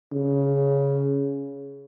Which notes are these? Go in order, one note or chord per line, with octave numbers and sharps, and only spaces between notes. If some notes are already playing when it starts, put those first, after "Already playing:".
C#3